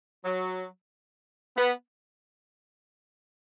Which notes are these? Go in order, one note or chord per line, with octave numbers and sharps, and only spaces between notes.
F#3
B3